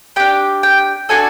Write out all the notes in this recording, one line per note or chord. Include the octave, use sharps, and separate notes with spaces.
D4 G4 G5
G5
D4 F#4 A4 G#5